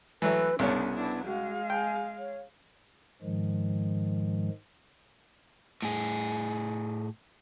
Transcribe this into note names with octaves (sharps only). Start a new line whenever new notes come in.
E3 F#3 A3 B4
C2 C#3 B3 C#4 D4 C#5
B3 D4 E4
G#3 F#4 F5
G5 G#5
C#5
G#2 D#3 F3 G#3
A2 G#4